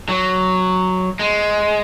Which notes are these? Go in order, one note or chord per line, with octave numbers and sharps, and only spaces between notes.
F#3
G#3